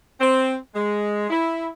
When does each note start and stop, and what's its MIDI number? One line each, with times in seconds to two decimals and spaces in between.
0.20 0.55 60
0.75 1.28 56
1.30 1.68 64